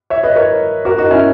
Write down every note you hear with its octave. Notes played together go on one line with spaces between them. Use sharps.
C#5 E5
B4 D#5
A#4 C#5
F#4 A#4
D#4 F#4
C#4 E4